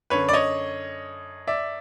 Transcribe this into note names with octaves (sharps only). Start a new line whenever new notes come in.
F#2 D3 B4 C#5
D5
C#5 D#5
D5 E5